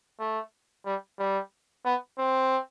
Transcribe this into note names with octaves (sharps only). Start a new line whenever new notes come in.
A3
G3
G3
B3
C4